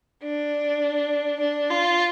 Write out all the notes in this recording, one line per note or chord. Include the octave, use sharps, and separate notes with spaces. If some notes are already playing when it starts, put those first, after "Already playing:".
D4
D4
F4